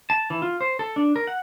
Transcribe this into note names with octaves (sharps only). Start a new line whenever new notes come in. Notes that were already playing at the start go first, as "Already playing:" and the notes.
A5
E3
F4
C5
A4
D4
A#4
F#5